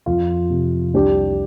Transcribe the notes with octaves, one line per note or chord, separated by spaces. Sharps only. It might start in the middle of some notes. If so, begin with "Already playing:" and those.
F2 F4
C3
C2 D4 G4